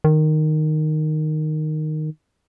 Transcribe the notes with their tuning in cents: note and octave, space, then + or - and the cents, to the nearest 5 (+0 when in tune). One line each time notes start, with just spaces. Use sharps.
D#3 -10